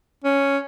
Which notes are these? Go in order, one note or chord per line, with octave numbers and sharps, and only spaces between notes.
C#4